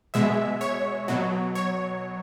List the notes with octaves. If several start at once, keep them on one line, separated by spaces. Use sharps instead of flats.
B2 G#3 E5
C#5
B2 F#3
C#5